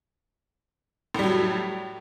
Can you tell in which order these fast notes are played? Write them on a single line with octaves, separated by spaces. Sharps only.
A2 G3 F#3